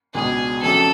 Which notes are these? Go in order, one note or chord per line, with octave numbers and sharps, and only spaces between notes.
C#2 B2 G#3 D4 G#4
F2 C#3 F#3 A3 D4 A4